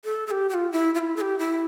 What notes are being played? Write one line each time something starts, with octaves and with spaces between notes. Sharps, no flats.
A4
A4
G4
G4
F4
E4
F4
E4
A4
G4
E4